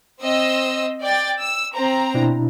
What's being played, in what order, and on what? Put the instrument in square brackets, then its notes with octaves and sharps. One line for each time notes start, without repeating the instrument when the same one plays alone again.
[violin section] C4 D#5 E6
D5 G5 A6
E6
C4 A#5
[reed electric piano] B2 D4 E4